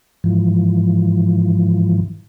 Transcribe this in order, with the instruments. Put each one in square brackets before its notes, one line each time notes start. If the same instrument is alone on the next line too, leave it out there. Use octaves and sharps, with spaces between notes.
[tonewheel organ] G#2 E3 F3